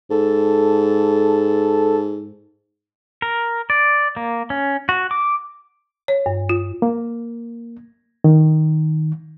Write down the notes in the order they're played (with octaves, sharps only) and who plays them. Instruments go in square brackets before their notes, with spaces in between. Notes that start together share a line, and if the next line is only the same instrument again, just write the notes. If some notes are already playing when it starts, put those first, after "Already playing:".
[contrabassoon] G#2 [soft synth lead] A4
[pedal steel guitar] A#4
D5
A#3
C#4
F#4
D6
[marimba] C#5
G2
F4
[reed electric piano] A#3
D#3